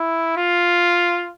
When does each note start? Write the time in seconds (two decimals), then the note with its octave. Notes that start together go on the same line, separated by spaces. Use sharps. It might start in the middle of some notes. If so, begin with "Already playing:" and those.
Already playing: E4
0.37 F4